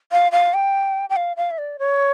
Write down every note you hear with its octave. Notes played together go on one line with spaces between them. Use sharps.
F5
F5
G5
G5
F5
F5
E5
D5
C#5